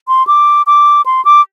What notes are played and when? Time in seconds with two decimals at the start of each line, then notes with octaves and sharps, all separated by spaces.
0.08 C6
0.27 D6
0.67 D6
1.06 C6
1.25 D6